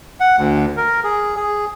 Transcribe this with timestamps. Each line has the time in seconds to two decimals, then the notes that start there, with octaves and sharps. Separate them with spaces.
0.20 F#5
0.37 D2
0.77 A#4
1.04 G#4
1.36 G#4